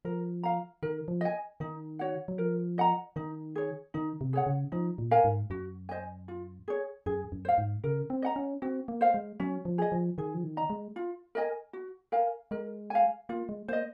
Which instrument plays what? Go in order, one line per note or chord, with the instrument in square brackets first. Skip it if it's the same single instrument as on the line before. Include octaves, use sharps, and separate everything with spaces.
[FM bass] F3 [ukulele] A#4
[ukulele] F5 A#5
[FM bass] D#3 [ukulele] A#4
[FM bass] F3
[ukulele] D#5 G#5
[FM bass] D#3 [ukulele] D#4
[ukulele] F#4 C#5 F#5
[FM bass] F#3
[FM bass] F3 [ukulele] A#4
[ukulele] D#5 F#5 A#5
[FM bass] D#3 [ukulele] D#4
[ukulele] G#4 C#5
[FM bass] D#3 [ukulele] D#4
[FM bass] C3
[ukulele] G#4 C#5 F#5
[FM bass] C#3
[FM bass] F3 [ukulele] D#4
[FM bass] A#2
[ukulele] A#4 F5 G#5
[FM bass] G#2
[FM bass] F#2 [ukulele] F#4
[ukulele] C5 D#5 G#5
F4
G#4 C#5
[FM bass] F#2 [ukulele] G#4
[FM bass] F#2
[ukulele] C5 F5
[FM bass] G#2
[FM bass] C#3 [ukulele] A#4
[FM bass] C4
[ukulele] D#5 F#5 A#5
[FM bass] C#4
[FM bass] C4 [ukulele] F#4
[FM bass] A#3
[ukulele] C5 F5
[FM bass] G#3
[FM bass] F#3 [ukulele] C#4
[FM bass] F3
[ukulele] G#4 D#5
[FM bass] F3
[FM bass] D#3 [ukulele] G#4
[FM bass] F3
D#3
[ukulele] D#5 A#5
[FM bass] G#3
[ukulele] F4
A#4 D#5 G#5
F#4
A#4 F5 G#5
[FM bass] G#3 [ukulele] A#4
[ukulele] F5 G#5
[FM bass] A#3 [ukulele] F4
[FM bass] G#3
[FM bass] A#3 [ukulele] C5 D#5